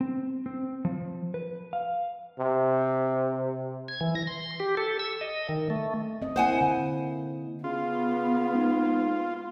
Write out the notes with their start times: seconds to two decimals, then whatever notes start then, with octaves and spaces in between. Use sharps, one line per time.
0.01 C4
0.46 C4
0.85 F3
1.34 B4
1.73 F5
2.39 C3
3.88 G#6
4.01 E3
4.15 A#6
4.27 C6
4.60 G4
4.77 A4
4.99 E6
5.21 D#5
5.49 D#3
5.70 A3
6.22 C4 D#5
6.36 A#3 E4 C5 F#5 G#5
6.61 D3
7.64 C#3 B3 F4
8.53 G#2